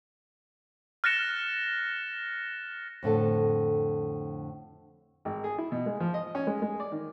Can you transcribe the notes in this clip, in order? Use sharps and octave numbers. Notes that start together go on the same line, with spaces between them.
F6 F#6 A6 A#6 C#7 E7
F2 A2 D3 A4
G#1
G#4
E4
B2
G#3
F3
D#5
C#4
G#3
G#3
D5
D#3